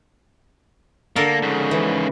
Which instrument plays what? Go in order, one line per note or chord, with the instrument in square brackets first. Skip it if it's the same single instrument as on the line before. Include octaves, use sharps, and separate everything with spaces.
[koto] D3 A4 A#4 [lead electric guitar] A#3
[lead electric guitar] G#2 C#3
[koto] E3